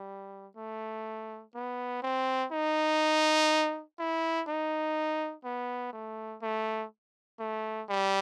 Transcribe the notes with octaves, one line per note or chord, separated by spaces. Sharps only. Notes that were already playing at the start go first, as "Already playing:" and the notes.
Already playing: G3
A3
B3
C4
D#4
E4
D#4
B3
A3
A3
A3
G3